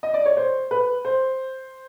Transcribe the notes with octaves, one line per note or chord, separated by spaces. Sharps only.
D#5
D5
C#5
C5
B4
C5